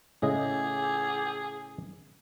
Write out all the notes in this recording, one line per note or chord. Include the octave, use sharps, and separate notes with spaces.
A2 C#3 G#4 D#5